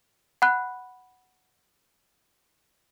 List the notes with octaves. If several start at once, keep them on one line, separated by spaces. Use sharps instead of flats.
F#5 B5 F#6